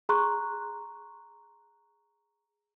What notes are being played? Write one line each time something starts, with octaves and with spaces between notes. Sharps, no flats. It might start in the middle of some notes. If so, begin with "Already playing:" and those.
G#4 A#5 C6 C#6 F#6